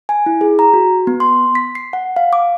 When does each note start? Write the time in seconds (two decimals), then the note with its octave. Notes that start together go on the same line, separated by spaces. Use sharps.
0.09 G#5
0.26 E4
0.41 G#4
0.59 A#5
0.73 F#4
1.07 B3
1.20 C6
1.55 B6
1.75 C7
1.93 F#5
2.16 F5
2.33 D6